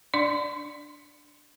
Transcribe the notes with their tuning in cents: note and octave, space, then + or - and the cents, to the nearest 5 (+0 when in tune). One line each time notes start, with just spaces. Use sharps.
D4 +0 D5 +0 C6 +0